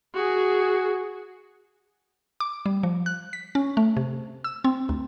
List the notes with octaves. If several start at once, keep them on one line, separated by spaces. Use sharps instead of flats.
F#4 G#4
D6
G3
F3
F#6
B6
C#4
A3
C3
E6
C4
D2